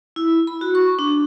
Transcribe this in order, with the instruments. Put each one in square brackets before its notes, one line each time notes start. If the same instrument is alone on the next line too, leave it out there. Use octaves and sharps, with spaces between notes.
[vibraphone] E4
B5
F#4
C#6
D4